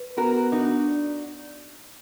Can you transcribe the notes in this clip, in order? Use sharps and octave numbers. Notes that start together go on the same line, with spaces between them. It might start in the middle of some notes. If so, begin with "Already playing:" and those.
Already playing: B4
B3 F#4 A#4
D4 D#4 F#4
D5